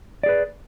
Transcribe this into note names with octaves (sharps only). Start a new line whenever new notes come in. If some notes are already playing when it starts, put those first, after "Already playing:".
G#4 B4 D5